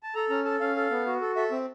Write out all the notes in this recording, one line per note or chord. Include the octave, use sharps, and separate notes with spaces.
A5
A4 A#5
C#4 A#5
A4 A5
C#4 F5
A4
B3
F#4
A4
A4 E5
C4